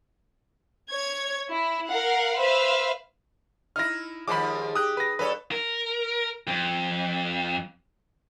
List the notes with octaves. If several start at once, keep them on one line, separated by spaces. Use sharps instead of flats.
C#5 G#6
E4
A#4 F5 F#5
B4 C5 E5 F5
D#4 E4 F6 A#6
D#2 F3 G#3 B5 D6
G4 D#6 F#6
B4 A#6
G2 A4 B4 C#5
A#4
F2